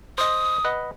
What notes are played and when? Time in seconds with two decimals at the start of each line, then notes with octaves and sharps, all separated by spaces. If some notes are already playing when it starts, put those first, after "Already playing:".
0.18 C5 D#5 D#6
0.65 B4 D#5 F#5